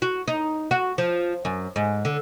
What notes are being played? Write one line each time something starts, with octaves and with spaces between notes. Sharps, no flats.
F#4
D#4
F#4
F3
F#2
G#2
D3